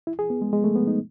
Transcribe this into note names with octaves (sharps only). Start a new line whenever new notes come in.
E4
G#4
B3
G#3
G#3
A3
B3
D#4